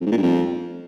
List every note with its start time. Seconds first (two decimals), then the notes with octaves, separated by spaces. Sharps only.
0.01 F2
0.06 G#2
0.12 A#2
0.17 G2
0.23 F2